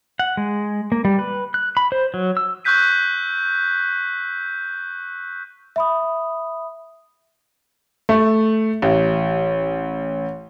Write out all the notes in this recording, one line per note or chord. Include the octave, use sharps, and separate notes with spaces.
F#5
G#3
A#3
G3
B4
F#6
B5
C5
F#3
E6
C#6 E6 F#6 G6 B6 D#7
E5 B5 D#6
A3
A1